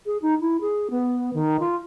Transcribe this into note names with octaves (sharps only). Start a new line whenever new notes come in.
G#4
D#4
E4
G#4
B3
D#3
F4